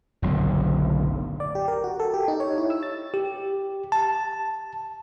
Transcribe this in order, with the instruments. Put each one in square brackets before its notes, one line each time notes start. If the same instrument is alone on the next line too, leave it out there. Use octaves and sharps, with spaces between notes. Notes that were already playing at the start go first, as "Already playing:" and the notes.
[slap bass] F#1 B1 A2 D3
[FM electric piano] D5
G4
A#4
F#4
A4
G4
D#4
C#5
E4
E6
A6
[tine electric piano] G4
A5